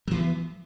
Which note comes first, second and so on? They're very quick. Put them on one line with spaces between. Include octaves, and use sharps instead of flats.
F#3 E3 B3